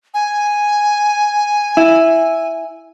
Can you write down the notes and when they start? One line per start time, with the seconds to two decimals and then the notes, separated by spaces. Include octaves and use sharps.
0.14 G#5
1.77 E4